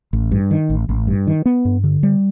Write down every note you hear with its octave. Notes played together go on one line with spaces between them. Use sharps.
A1
G2
D#3
A1
A1
G2
D#3
B3
G2
D3
G3